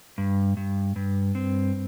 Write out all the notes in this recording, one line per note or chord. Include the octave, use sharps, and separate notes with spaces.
G2
G2
G2
C4